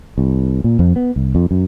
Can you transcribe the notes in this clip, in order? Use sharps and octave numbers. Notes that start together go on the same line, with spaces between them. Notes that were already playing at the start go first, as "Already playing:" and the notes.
C2
A#2
F2
B3
C2
F2
F#2